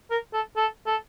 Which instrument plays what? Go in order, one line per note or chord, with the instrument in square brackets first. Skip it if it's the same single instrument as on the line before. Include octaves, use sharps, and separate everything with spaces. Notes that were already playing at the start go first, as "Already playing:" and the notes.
[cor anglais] A#4
A4
A4
A4